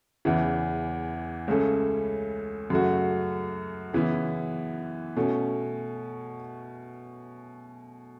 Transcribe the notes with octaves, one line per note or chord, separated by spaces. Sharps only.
E2 C#3 E3
C#2 C#3 A3 C#4 A4
F#2 C#3 A3 F#4
C#3 E3 B3 E4
B2 A3 C#4